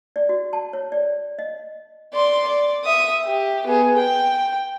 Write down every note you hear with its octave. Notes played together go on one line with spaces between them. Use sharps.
D5
F#4
A5
C#5
D5
D#5
D5 C6
D5
E5 D#6
G4
B3 G#4
G5